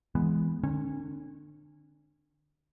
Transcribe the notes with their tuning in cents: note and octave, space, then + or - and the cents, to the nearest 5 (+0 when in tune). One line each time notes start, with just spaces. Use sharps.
E3 +0 G#3 +0 B3 +0
D3 +30 C#4 -30